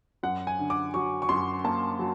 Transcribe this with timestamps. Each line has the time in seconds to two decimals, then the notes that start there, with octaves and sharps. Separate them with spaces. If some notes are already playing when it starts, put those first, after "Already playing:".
0.23 F#2 F#5
0.47 G#5
0.59 D3
0.70 D6
0.94 F#3 C#6
1.22 C#6
1.29 F#2 C6
1.64 A#3 A5
1.99 F#3